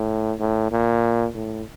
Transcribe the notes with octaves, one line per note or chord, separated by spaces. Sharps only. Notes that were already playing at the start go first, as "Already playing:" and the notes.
Already playing: A2
A2
A#2
A2